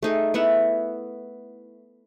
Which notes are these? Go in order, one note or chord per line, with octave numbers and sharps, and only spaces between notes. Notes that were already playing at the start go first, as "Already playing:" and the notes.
A3 D#4 G#4
B3 E4 E5 F#5